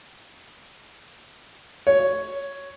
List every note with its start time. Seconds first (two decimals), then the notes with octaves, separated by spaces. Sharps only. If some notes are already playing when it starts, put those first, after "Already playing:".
1.87 C#5